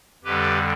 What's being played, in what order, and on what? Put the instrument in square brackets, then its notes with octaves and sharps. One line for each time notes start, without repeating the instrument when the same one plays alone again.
[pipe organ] F2 D3 G3 G4 B4